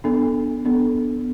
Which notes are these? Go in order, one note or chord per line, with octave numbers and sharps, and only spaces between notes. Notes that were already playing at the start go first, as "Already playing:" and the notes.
B3 D4 A4
B3 D4 A4